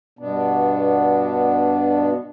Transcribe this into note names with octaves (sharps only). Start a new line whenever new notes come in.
G2 B2 B3 D4